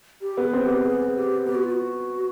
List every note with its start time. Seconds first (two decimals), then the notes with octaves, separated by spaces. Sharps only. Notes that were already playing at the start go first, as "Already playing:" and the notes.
0.22 G4
0.37 B3
0.43 G#4
0.53 C4
0.63 B3 G4
0.84 G#4
1.15 G4
1.46 B3 G4
1.55 F#4
1.63 F4
1.71 F#4